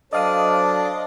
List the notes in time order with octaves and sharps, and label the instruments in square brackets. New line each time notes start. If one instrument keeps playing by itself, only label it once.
[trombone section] F#3 A4 C5 [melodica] D4 D5 [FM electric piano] D#5 F5 D#6